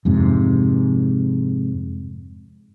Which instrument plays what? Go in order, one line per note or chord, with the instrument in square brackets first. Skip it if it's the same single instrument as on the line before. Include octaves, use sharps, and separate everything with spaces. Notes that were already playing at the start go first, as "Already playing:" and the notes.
[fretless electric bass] F2 G#2 C3